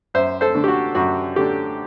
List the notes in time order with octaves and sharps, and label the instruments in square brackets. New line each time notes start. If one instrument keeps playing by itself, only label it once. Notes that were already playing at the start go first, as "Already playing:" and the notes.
[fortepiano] F#2 C5 E5
A4 C5
D3 A3 D4
G4
F#4
F#2 F#4
D3 A3 D4 G4